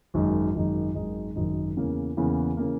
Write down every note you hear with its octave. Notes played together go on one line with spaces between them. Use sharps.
G#1 F#2 D#3 G#3 D#4
G#1 F#2 D#3 G#3 D#4
G#1 F#2 D#3 G#3 D#4
G#1 F#2 D#3 G#3 D#4
E2 C#3 E3 A#3
E2 C#3 E3 A#3
C#3 E3 A#3